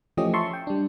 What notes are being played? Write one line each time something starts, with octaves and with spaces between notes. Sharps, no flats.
E3 F3 A3 C#4 G4 D#5
E5 A5 C6 C#6
G5
G3 D4